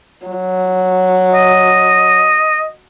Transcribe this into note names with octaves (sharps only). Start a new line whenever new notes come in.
F#3
D#5